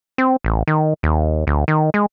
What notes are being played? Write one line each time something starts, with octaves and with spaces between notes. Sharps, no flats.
C4
A1
D#3
D#2
D2
D#3
G#3